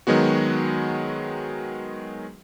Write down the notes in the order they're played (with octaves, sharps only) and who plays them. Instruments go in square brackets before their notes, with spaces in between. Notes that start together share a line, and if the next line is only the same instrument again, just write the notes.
[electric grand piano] D#3 F#3 G#3 B3 F#4